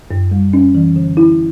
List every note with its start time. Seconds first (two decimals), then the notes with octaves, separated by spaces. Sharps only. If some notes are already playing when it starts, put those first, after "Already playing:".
0.11 F#2
0.31 G3
0.53 C#4
0.75 E3
0.96 D3
1.17 E4